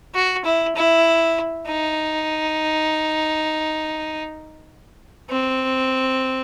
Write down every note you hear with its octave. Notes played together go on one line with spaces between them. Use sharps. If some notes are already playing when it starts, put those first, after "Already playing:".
F#4
E4
E4
D#4
C4